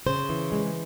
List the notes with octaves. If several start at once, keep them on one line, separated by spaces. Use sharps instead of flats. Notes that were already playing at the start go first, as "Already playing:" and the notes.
C#3 C5
E3
G#3